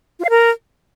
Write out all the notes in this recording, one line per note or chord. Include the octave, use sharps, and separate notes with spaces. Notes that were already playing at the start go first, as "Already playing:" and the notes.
F4
F5
A#4